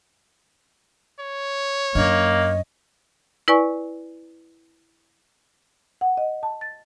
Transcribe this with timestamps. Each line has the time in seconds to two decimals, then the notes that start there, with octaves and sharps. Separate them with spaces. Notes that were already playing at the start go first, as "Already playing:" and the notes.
1.20 C#5
1.95 F#2 A#3 D4 D#5
3.48 E4 B4 D5 G#5 C#6
6.01 F#5
6.17 D#5
6.43 A5
6.61 A6